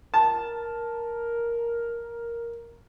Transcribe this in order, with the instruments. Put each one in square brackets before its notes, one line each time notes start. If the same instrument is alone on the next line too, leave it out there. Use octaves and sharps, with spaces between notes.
[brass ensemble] A#4 [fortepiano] A5